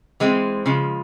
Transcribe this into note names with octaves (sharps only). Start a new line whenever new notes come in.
E3 G#3 C4
C#3 F3 G#3